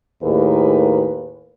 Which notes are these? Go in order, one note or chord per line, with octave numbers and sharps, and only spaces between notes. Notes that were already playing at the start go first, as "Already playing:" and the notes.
D#2 A2 G#4 A#4 B4